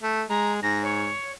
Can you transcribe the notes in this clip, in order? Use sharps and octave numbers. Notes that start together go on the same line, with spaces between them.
A3
G#3 A#5
G#2 A#6
C#5